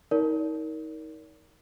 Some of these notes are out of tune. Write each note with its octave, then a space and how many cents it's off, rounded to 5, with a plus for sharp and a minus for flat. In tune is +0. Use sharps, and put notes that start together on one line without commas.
D#4 +30 A#4 +0 D5 -45